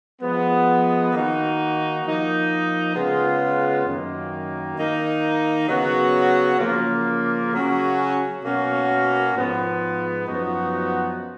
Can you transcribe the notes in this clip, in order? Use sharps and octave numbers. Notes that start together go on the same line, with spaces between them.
F3 G#3 B3
D#3 A#3 D#4 F#4
F3 A#3 D#4
C#3 G#3 B3 F4
F#2 D#3 A#3
D#3 A#3 D#4
C#3 F#3 B3 F#4
C#3 F3 A#3
C#3 F#3 C#4 F#4
B2 A#3 C#4 F#4
G#2 F3 B3
F#2 F3 B3 D#4 F#4